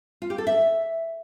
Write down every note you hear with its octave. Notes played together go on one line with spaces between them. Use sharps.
F4
G4
A4
E5